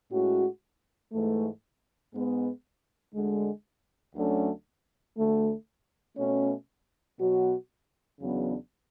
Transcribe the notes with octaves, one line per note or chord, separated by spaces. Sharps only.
A2 G#3 C#4 F#4
G#2 E3 A3
G#2 G#3 B3
D2 D3 G#3
D2 D3 F#3 A3 C#4
D2 D3 A3
B2 A3 C#4
B2 F#3 B3 F#4
E2 C#3 F#3 B3 D4